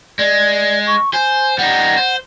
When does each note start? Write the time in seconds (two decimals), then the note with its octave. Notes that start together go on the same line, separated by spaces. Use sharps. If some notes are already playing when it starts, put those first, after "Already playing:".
0.19 G#3 D5
0.87 C#6
1.14 C5 G#5
1.58 G3 D#4 F#5
1.97 C5